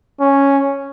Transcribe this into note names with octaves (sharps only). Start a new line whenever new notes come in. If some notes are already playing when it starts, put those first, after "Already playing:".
C#4